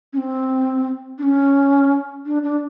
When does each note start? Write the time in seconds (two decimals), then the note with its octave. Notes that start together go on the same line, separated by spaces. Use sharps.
0.13 C#4
0.17 C4
1.18 D4
1.23 C#4
2.26 D4
2.43 D4